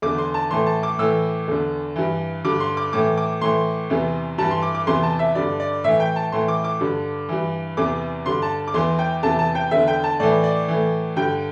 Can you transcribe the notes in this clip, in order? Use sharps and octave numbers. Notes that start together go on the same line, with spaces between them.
E2 D3 D6
C6
A5
A2 E3 C6
A5
D6
A2 E3 E6
E2 D3
G2 E3
G2 D3 D6
C6
D6
A2 E3 D6
D6
A2 E3 C6
E2 C3 E3
G2 E3 A5
C6
D6
D6
E2 C3 E3 C6
A5
E5
G2 D3 D5
D5
A2 E3 E5
G5
A5
A2 E3 C6
D6
D6
G2 D3
G2 E3
E2 C3 E3 D6
G2 D3 C6
A5
D6
E2 E3 C6
G5
E2 C3 E3 A5
A5
G5
E2 D3 E5
G5
A5
A2 E3 D5
D5
A2 E3
G2 D3 G5